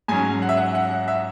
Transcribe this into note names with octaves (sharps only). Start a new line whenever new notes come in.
G#2 F#3 C#4 G#5
F#5
E5
F#5
F#5
F#5
E5